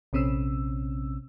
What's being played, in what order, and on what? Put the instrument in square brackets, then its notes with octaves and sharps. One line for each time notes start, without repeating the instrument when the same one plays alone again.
[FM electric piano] A#1 C3 C4 C#4 E6